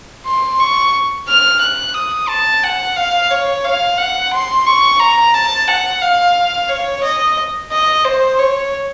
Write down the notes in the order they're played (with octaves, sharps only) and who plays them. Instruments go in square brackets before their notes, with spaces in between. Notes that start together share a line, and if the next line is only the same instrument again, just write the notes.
[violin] C6
C#6
F6
F#6
D#6
A5
F#5
F5
C#5
F5
F#5
C6
C#6
A#5
A5
F#5
F5
C#5
D#5
D#5
C5
C#5